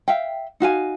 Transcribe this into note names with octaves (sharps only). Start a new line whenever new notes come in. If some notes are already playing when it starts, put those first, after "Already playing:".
E5 F5 G5
D#4 F#4 F5 G#5